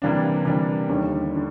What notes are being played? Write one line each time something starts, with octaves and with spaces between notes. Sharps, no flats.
C3 E3 G3 A#3 D4
C3 E3 G3 A#3 D4
D#2 D3 G3
D3